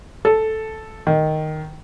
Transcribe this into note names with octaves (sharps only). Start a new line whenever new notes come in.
A4
D#3